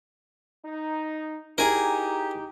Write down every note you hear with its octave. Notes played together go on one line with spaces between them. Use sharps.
D#4
D#4 E4 G4 G#4 A#4 G#5